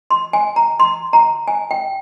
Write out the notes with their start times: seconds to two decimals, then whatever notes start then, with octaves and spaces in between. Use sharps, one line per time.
0.11 C6
0.33 G#5
0.56 A#5
0.80 C6
1.13 A#5
1.48 G#5
1.71 G5